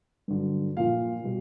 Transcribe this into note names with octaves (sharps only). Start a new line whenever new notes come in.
G2 D3 F#3
A#2 F3 F5
B2 G3